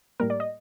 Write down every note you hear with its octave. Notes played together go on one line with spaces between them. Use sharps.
A2 G3 A#3 A#4
D5
D#5